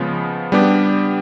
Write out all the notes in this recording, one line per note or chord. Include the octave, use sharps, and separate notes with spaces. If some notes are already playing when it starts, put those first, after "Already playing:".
Already playing: C#3 F3 G#3 B3
G3 B3 D4 G4